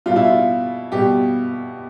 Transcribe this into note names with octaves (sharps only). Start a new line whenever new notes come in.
B2 G3 F4
E4
F4
B2 G3 G4